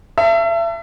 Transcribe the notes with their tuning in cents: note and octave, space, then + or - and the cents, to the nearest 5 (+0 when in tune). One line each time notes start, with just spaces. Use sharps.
E5 +35 A5 +30